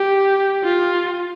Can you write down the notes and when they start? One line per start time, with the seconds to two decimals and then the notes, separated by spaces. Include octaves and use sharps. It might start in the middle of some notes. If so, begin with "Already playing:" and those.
Already playing: G4
0.63 F4